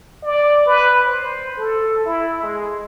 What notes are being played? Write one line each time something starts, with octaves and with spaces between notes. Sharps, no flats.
D5
B4
C5
A4
E4
G#3